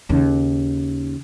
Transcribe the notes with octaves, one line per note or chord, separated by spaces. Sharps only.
D#2 C#3